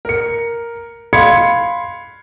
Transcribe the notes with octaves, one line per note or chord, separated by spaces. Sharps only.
A#4 C#7
F5 B5 C6 G#6 C#7